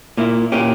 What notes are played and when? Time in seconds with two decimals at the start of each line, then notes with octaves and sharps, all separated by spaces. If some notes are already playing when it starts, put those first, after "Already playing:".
0.17 A#2 A#3 E4
0.52 A#2 A#3 C#4 G4